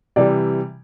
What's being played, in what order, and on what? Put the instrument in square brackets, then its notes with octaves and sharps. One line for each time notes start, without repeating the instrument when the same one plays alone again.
[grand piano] C3 E3 G3 [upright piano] D5